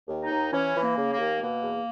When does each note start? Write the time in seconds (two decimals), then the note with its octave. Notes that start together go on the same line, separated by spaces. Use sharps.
0.08 D#2
0.23 D#4
0.30 D#2
0.52 E3 C#4
0.75 E3
0.82 A#3
0.97 C#3
1.12 A#3
1.18 D#2
1.41 B2 A#3
1.63 E2